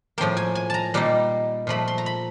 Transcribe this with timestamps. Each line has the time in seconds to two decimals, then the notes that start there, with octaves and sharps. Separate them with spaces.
0.18 A2 F3 A#3 G5
0.37 G#5
0.55 G#5
0.70 A5 A#5
0.94 A#2 G3 A#3 D#4
1.67 A#2 F3 A3 B5
1.88 C6
1.98 A#5
2.06 B5